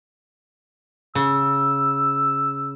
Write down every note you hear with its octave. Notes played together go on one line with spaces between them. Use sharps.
C#3 E6